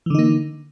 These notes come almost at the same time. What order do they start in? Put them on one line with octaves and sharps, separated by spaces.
E3 D3 D#4 A#3